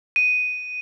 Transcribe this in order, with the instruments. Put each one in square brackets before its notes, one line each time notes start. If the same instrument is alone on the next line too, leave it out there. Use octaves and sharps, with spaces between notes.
[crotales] D#7